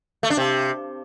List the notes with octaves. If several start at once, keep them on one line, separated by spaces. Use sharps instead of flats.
A3
D4
C3